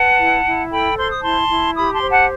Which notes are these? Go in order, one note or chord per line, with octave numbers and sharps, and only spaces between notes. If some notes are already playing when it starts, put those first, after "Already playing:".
Already playing: B4 F#5 A5
E4
E4
A4 G5 B5
C5 C6
D#6
E4 A5 C6
E4
G4 B5 D#6
A5 C6
C5
F#5 A5